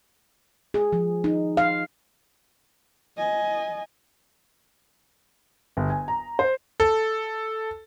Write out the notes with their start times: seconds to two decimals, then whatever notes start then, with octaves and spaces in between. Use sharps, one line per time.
0.74 G#4
0.93 F3
1.24 D#4
1.57 F5
3.17 D#5 G#5
5.77 G1
5.90 G#5
6.08 A#5
6.39 C5
6.80 A4